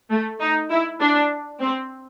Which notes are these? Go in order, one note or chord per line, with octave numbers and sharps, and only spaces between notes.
A3
D#4
E4
D4
C4